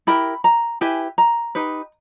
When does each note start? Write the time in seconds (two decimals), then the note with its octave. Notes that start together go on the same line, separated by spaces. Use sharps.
0.07 E4 G4 A#4 B5
0.44 A#5
0.81 E4 G4 B4 G#5
1.18 A#5
1.55 D#4 G4 B4